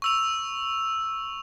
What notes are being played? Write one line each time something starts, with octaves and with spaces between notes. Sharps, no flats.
C#6 E6 F7